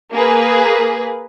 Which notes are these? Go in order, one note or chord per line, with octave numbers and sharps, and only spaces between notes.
A#3 G#4 B4